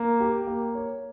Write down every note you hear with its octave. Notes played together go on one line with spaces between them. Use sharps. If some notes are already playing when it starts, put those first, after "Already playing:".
Already playing: A#3
G4
A#3
C#5